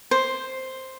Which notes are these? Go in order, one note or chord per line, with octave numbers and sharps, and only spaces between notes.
C5